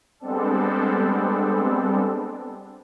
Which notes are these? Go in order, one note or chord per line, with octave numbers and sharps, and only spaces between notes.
G3 G#3 B3 C4 D4 A4